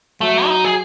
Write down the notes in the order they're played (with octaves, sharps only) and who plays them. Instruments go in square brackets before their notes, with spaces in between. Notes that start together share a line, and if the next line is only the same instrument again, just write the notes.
[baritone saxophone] F#3 [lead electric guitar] A3
[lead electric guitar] E4
D#4
G#4